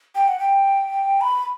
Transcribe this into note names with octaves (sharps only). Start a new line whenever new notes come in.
G5
F#5
G5
B5